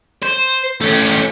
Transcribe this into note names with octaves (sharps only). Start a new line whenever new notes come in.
C5
A3 C#4